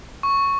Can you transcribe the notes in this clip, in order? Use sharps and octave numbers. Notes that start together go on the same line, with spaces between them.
C#6